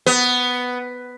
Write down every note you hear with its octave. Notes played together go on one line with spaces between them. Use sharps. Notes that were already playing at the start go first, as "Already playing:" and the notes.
B3